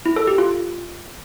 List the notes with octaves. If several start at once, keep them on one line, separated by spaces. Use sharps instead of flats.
E4
A4
G4
F4